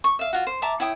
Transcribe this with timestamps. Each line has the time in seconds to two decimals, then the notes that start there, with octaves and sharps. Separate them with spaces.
0.04 C#6
0.19 E5 F5
0.33 F4 F#4
0.47 C5
0.62 E5 A5 A#5 D6
0.80 E4 C#5 G5 D#6